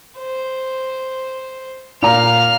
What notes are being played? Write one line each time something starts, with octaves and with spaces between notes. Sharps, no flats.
C5
A#2 F5 A#5 F6